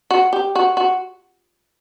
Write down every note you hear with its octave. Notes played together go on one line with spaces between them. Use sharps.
F#4
G4
F#4
F#4